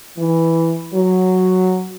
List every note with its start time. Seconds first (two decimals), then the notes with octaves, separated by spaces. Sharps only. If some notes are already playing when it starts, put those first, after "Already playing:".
0.17 E3
0.94 F#3